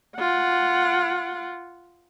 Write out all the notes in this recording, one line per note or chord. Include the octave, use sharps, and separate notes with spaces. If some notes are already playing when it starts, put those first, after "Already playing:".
F4 F#5